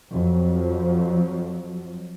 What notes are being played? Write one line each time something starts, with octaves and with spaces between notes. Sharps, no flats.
F2 F3 F#3